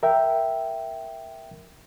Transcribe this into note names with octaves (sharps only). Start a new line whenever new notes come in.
A#4 E5 G5